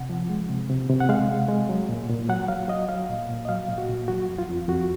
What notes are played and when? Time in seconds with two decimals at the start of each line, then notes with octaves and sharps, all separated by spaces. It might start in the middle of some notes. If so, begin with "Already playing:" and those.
Already playing: C3 F#5
0.10 F3
0.29 G#3
0.49 C3
0.70 C3
0.89 C3
1.00 F#5
1.09 G#3 F5
1.29 C3
1.49 G#3
1.69 F#3
1.89 A#2
2.09 A#2
2.29 F#3 F#5
2.48 F#3 F5
2.68 F#3 D#5
2.89 F#3 F5
3.09 A#2
3.29 A#2
3.45 D#5
3.49 F#3 F5
3.69 A#2
3.78 F#4
3.89 A#2
4.08 F#3 F#4
4.29 F2
4.38 F4
4.49 F2
4.68 F2 F#4